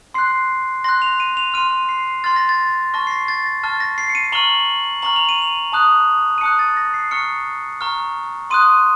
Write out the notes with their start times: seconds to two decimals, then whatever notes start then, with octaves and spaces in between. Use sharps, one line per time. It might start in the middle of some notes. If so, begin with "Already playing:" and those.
0.14 C6 F#6 C7
0.84 C6 F#6 A#6
1.02 F7
1.20 D#7
1.37 F7
1.54 C6 F6 D#7
1.89 C7
2.24 C6 F6 A6
2.36 A#6
2.49 A6
2.94 A5 C#6 F6 A#6
3.07 C7
3.11 A#6
3.28 A6
3.46 A#6
3.63 A5 C#6 F6 A6
3.80 A#6
3.98 C7
4.10 C#7
4.15 D#7
4.32 A#5 C#6 F6 F#7
5.02 A#5 C#6 F6 F#7
5.16 F7
5.29 D#7
5.42 F7
5.72 A5 D#6 F#6
6.38 D#7
6.41 A5 D#6 F#6 C#7
6.59 A6
6.77 A#6
6.94 C7
7.11 A#5 C#6 F6 C#7
7.81 A#5 C#6 F6
8.50 C6 D#6 F#6 D#7